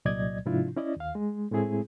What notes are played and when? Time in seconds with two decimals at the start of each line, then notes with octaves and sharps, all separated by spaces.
0.05 C2 A#2 F#3 D5 D#5 G#6
0.46 G#2 C3 F3 D4 E4 F4
0.76 C#4 E4 D5 D#5
0.96 D#2 F5
1.15 G#3
1.51 A2 G#3 A3 C4 E4 G#4